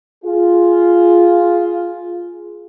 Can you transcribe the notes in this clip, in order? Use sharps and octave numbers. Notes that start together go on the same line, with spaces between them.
F4 G#4